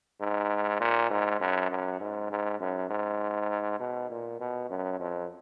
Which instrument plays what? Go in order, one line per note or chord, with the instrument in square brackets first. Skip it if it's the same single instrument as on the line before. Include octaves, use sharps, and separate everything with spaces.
[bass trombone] G#2
A#2
G#2
F#2
F#2
G#2
G#2
F#2
G#2
B2
A#2
B2
F#2
F2